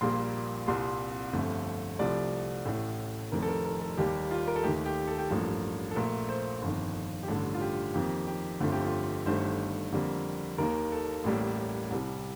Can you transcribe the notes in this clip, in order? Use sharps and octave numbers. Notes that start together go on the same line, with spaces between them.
A#1 A#2 G3 A#3 C6
C2 A#2 G3 C6
G1 F2 D3 A3
C2 C3 F3 A3 D5
A1 A2 A3
F1 F2 D#3 A#4
A4
A#4
A#4
A4
D#2 D#3 G3 A#3 G4
F4
A#4
A4
D#2 D#3 A3 G4
G4
A4
G4
A1 G2 F3 A#3 A4
A4
A#1 A#2 A3 A#4
C5
G1 F2 D#3
G4
A1 G2 D3 A4
F4
G4
F2 D#3 A#3 G4
G4
G1 F2 D3 A3 F4
G4
F4
G1 G2 D#3 A3 C5
F2 D3 G3 A#3
D#2 D#3 A#3 A#4
A4
A1 A2 G3 A#3
C2 C3 G3